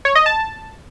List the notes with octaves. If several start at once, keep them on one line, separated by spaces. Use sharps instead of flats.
C#5
D#5
A5